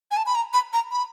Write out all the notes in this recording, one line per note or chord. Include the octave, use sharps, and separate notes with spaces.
G#5
A5
B5
A#5
B5
A#5
B5